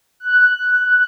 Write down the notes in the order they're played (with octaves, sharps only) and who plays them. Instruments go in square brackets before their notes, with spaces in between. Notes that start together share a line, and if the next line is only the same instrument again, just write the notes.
[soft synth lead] F#6